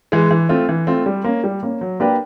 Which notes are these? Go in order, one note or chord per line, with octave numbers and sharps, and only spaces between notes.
E3 G#3
E3
A3 C4 F4
E3
A3 C4 F4
G3
A#3 C#4
G3
A#3 C#4
F#3
A#3 D4 G4 B4